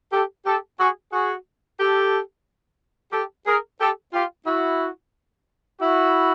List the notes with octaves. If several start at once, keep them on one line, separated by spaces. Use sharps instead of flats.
G4 A4
G4 A4
F#4 G#4
F#4 G#4
G4 A4
G4 A4
G#4 A#4
G4 A4
F4 G4
E4 F#4
E4 F#4